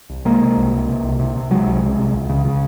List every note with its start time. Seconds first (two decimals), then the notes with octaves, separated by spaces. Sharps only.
0.10 C2
0.25 C3 G#3 A#3
0.41 C3
0.57 C2
0.73 C3
0.89 C3
1.04 C2
1.19 C3
1.35 C3
1.51 C3 F#3 G#3
1.67 C2
1.82 C3
1.98 C2
2.14 C#2
2.30 C#3
2.45 C#3